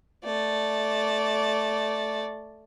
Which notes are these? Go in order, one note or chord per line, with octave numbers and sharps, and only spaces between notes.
A3 D5